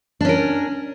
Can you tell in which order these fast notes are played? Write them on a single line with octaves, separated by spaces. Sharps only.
D4 C#4 A#4